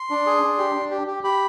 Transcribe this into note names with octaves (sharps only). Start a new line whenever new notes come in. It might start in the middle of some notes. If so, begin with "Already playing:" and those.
Already playing: C6
D4
G#4
D4
G4
D4
G4
G4
G4 B5